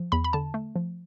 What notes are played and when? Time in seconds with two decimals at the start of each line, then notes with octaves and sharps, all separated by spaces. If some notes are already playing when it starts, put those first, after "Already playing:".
Already playing: F3
0.12 E2 B5
0.24 B5
0.33 D3 A5
0.54 A3
0.76 F3